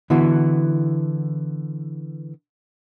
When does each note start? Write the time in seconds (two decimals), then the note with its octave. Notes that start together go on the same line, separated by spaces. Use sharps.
0.10 D3 E3 B3 E4 F#4